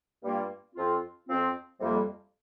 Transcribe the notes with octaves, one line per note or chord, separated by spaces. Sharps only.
G2 G3 A#3 F4
F2 F3 C4 F4
F2 F3 C4 F4
F2 C3 G3 A#3